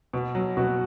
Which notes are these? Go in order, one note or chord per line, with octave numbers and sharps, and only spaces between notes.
B2
F#3
B2 F#4